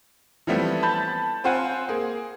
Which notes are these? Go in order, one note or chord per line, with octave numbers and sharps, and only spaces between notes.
E3 F3 G3 A3 B3 C4
A5 B5 G6 A6
C4 F4 C5 F#5 G#5
A#3 G#4